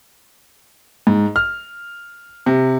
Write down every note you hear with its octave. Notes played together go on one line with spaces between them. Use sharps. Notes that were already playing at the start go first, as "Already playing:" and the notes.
G#2
F6
C3